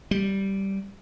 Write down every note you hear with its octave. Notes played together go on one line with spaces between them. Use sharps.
G3